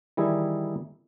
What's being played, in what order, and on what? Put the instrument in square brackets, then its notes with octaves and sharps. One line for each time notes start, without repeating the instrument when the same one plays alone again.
[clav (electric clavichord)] D#3 E3 G3 E4 G#4